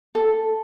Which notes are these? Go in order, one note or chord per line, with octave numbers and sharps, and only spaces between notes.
A4